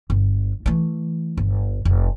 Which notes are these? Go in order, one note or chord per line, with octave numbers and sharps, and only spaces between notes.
G1
E3 A3
G1
F1